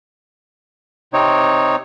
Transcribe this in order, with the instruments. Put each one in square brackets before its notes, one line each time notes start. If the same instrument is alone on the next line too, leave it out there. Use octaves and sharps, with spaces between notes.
[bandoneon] C3 C4 D#4 C#5